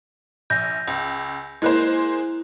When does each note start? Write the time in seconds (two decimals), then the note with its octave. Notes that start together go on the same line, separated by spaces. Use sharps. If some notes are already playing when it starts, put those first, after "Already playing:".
0.50 A#1 G6 A#6
0.88 C#2
1.62 G#3 A#3 E4 C5 F#6